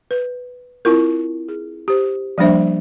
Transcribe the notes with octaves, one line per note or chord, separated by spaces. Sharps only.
B4
C4 E4 F4 A#4
G#4
G4 C5
F3 G3 A#3 D4 C5 E5